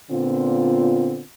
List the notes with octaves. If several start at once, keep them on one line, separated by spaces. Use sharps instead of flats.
A#2 D3 B3 C4 F4